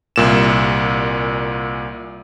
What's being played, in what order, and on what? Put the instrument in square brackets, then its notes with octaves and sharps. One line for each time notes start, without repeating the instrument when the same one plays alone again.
[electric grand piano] C2 A#2 E7